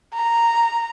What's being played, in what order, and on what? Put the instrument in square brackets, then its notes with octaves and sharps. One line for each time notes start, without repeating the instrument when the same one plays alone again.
[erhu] A#5